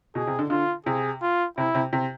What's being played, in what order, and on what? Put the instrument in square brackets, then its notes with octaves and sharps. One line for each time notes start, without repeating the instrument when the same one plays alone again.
[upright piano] B2 [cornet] G#4
[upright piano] C3
D3
[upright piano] D3 [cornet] F4
[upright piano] C3 [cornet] G#4
[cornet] F4
[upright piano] C3 [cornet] E4
[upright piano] C3
C3